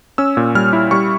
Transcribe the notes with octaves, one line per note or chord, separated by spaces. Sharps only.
C#4 E6
A#2
G3 F6
E4
G3 C#6